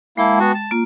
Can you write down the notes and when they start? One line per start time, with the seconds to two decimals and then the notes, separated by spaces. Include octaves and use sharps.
0.17 G#3 A#3 E4 G5 A5
0.40 B3 F#4
0.54 A5
0.71 A#3 F4